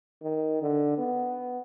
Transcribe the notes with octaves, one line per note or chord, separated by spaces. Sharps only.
D#3
D3
B3